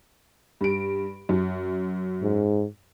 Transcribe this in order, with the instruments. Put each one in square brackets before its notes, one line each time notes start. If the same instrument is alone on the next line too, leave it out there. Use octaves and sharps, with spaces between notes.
[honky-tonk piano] G2 D7
F#2
[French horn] G#2